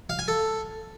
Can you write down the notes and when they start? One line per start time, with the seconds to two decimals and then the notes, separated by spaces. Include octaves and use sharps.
0.09 F5
0.19 G#5
0.28 A4